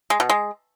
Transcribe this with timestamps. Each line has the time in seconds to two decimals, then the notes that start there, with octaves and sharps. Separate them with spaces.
0.10 G#3
0.20 B2
0.29 G#3